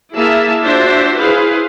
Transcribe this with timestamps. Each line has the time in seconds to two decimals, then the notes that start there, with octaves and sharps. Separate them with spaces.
0.13 A#3 E4 G#4 E5 A5
0.63 D4 F4 F#4 C5 E5
1.18 E4 G#4 B4 C5 F5